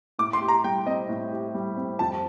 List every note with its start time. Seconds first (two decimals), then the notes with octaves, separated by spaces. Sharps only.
0.19 A2 D6
0.33 C6
0.41 G4
0.48 A#5
0.64 G3 G5
0.86 C4 D#5
1.09 A2
1.31 G4
1.54 G3
1.77 C4
1.99 F2 A5